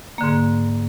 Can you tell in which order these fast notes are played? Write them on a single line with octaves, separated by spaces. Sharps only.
A#3 D3 G#2